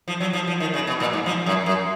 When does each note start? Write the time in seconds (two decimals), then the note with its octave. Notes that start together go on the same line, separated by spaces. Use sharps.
0.08 F3
0.20 F#3
0.33 F3
0.47 F3
0.60 D#3
0.74 C#3
0.87 B2
1.00 A#2
1.13 G#2
1.26 F3
1.46 F#2
1.66 F#2